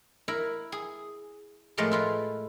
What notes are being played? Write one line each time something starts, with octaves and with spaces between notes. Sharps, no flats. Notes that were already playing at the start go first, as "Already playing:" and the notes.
E4 A#4
G#4
A2 F3 G#3 A3 A#4
E4 F4 B4